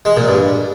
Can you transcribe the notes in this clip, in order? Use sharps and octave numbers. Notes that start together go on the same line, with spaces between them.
G#3
A#2
G2